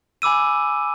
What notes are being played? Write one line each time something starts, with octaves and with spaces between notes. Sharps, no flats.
G#5 B5 D6 E6 D#7